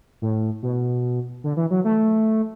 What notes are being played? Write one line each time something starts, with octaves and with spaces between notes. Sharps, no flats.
A2
B2
D3
E3
F#3
A3